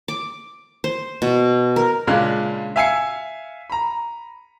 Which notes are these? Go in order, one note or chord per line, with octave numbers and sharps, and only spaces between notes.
D6
C5
B2
A#4
A#2 C#3 G#3 D4 F5 F#6
E5 F5 G#5 E6 C7 C#7
A#5 B5